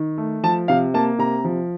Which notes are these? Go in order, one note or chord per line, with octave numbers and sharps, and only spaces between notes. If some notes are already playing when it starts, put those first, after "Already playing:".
Already playing: D#3
A3
F3 A5
C3 F5
A#3 A5
C3 A#5
F3